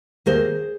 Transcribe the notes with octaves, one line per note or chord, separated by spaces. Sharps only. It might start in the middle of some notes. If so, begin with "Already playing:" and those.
D#2 D#3 A#3 G#4 C5